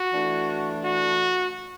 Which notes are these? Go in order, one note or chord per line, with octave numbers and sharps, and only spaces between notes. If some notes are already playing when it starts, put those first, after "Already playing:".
Already playing: F#4
E3 A3 D4
F#4